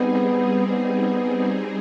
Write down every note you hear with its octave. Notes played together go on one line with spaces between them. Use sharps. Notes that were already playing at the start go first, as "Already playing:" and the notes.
Already playing: G3 B3 C4 D#4 G#4
B3